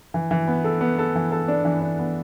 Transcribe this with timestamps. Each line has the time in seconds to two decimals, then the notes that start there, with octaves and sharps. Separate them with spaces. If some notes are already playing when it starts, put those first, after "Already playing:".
0.14 E3
0.31 E3
0.47 B3
0.64 A4
0.81 B3
0.99 A4
1.15 E3
1.32 A4
1.48 D4
1.65 E3
1.81 D4
1.99 B3